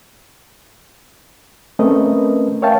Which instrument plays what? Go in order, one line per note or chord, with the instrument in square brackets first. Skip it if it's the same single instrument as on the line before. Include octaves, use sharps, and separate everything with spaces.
[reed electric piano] A3 C4 C#4 A#4 B4 D#5
A#4 C#5 E5 F5 G5 A5